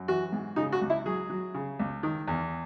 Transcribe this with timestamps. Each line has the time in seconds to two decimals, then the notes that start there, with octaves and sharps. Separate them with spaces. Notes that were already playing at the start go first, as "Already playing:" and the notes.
Already playing: F#2
0.08 E3 F#4
0.32 G#2
0.56 C#3 D#4
0.72 F#4
0.81 C#2
0.90 E4
1.06 F#3 G#4
1.30 F#3
1.55 C#3
1.80 C#2
2.03 D#3
2.28 E2